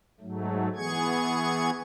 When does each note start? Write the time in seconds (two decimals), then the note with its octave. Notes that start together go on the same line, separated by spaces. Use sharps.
0.21 G#2 F#3 A3
0.76 E3 B3 G#4 C#6 G#6